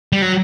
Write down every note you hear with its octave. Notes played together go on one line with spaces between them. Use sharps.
G3
F#3